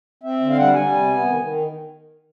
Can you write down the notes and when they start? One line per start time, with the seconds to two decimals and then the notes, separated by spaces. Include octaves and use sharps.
0.23 C4 E5
0.41 D3
0.50 F5
0.57 G3 F#5
0.74 G3 G#5
0.91 C3
1.08 B3
1.25 D#3
1.41 D#3